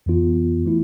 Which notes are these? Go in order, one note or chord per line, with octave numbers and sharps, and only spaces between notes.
F2 E3 B3 F4
E3 A3 E4